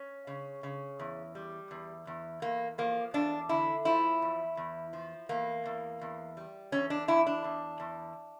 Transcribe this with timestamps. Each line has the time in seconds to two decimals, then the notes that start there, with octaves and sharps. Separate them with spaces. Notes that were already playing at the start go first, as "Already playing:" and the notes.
Already playing: C#4
0.27 C#3
0.63 C#3
1.00 E2
1.35 G3
1.71 E2
2.07 E2
2.42 E2 A#3
2.78 F3 A#3
3.14 E2 D4
3.49 D3 E4
3.85 F3 E4
4.22 E2
4.57 E2
4.93 F3
5.29 E2 A#3
5.66 E2
6.01 E2
6.37 G3
6.72 E2 C#4
6.90 D4
7.08 E2 E4
7.26 D4
7.44 E2
7.80 E2